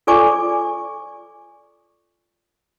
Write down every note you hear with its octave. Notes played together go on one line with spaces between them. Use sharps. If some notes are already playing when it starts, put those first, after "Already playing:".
F4 A4 D5 G#5 C#6 D6